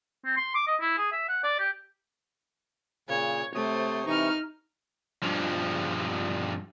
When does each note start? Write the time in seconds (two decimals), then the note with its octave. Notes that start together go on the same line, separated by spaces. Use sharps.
0.25 C4
0.37 C6
0.55 D6
0.67 D#5
0.81 E4
0.98 G#4
1.12 E5
1.29 F#5
1.43 D5
1.59 G4
3.09 A#2 C#3 C#5
3.55 C3 A3 C5 C#5 D#6
4.07 C3 E3 D#4 C#6 F6
5.23 G2 F3